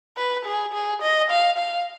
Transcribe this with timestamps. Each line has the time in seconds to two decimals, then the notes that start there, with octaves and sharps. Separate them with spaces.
0.17 B4
0.46 G#4
0.74 G#4
1.02 D#5
1.30 F5
1.58 F5